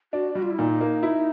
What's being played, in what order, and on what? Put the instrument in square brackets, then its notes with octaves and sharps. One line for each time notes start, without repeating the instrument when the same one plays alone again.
[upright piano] D4 [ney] F#4
[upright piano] G3 [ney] F#4
[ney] F4
E4
[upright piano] A#2 [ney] D#4
[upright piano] A#3
E4